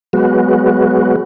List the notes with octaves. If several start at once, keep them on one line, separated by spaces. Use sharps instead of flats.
F#3 G#3 B3 F#4